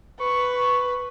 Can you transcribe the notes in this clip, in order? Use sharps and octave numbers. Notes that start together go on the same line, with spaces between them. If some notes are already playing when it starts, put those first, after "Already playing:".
B4 C#6